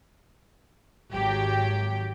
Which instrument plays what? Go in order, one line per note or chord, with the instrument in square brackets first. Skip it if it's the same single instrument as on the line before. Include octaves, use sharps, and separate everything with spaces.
[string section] G#1 F#3 G4